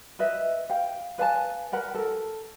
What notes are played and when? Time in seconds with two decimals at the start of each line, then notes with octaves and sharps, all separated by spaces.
0.19 B4 D#5 E5
0.70 F5 G5
1.18 B4 F5 G#5 A5
1.72 A#4 B4 F#5
1.95 A4 A#4